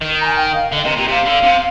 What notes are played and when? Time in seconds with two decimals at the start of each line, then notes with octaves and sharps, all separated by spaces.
0.01 D#3
0.20 A#5
0.25 G#5
0.37 G5
0.54 F5
0.73 D3 D#5
0.85 C3 A#4
0.97 A#2 G4
1.08 C3 F5
1.26 D3
1.43 C3